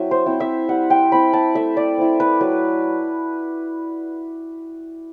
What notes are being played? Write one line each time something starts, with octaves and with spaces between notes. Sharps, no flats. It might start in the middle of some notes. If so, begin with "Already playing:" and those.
Already playing: F#3 C4 E4 E5
C5
C4 E4
E5
G3 F#5
G5
C4 E4 B5
A5
A3 E5
D5
C4 E4
B4
F#3 B4